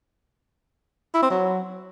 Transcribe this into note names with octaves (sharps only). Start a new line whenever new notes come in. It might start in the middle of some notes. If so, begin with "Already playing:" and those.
E4
C4
F#3